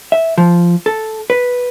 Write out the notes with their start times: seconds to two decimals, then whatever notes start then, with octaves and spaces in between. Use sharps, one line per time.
0.12 E5
0.38 F3
0.86 A4
1.30 B4